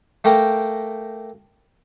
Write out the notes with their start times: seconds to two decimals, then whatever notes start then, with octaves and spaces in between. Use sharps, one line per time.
0.24 A3 A#3 G5 A#5